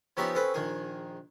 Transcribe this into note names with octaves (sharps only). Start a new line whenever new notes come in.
F3 B3 C#4 D#4 G4 E5
C4 C#4 A4 B4
A#1 D#3 G#4